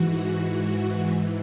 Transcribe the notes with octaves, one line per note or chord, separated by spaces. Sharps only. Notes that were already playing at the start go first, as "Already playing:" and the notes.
Already playing: G#2 E3 F#4